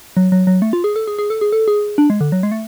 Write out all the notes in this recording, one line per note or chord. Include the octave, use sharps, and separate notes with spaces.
F#3
F#3
F#3
A3
F4
G#4
A4
G#4
G#4
A4
G#4
A4
G#4
D4
G#3
D3
F#3
G#3
A3